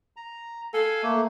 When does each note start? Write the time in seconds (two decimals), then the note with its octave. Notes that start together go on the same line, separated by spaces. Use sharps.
0.16 A#5
0.74 A4 F5 G#5
1.02 A3 A#3